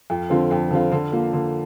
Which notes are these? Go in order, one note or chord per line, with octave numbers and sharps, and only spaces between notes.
F2
D3 F3 C4 F4
F2
D3 F3 C4 F4
D3
F3 A#3
D3